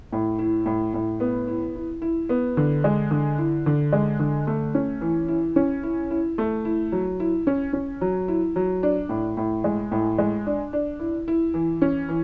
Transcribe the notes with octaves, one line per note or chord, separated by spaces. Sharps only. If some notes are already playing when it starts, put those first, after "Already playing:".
A2
E4
A2
A2
B3
E4
E4
E4
B3
D3
G#3
D3
E4
D3
G#3
D3
A3
C#4
E3
E4
C#4
E4
E4
A3
E4
F#3
E4
C#4
C#4
F#3
E4
F#3
D4
A2
A2
G#3
A2
G#3
D4
D4
E4
E4
E3
C#4
E3